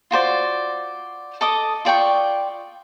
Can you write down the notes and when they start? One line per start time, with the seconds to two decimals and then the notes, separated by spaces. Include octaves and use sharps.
0.11 F4 F#4 C5 D5
1.41 A4 D#5 D6 D#6
1.85 F4 D5 G5 C#6